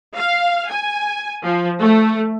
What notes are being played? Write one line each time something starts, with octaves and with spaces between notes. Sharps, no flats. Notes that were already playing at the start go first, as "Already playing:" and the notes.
F5
G#5
F3
A3